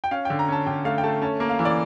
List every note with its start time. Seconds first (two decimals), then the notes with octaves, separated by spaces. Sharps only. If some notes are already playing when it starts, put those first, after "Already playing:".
0.04 G5
0.11 C#4 F5
0.25 G5
0.30 D3
0.39 A#5
0.48 C#4 A5
0.66 D3 G5
0.85 A3 F5
0.98 G5
1.03 A3 A5
1.22 C#4 A5
1.40 A#3
1.49 F5
1.59 E3
1.65 D5